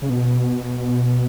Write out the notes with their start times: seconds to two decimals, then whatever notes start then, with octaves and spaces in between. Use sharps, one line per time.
0.02 C#3
0.10 B2